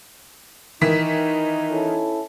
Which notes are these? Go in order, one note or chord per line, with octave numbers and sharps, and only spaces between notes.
D#3 E3 D#4 B6
C#4 E4 A4